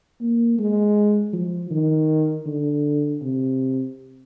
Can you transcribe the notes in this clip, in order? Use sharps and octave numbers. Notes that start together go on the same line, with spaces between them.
A#3
G#3
F3
D#3
D3
C3